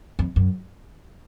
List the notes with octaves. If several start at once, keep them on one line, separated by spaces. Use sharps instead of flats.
F2
F#2